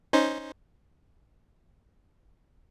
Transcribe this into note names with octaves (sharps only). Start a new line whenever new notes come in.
C#4 D#4 C5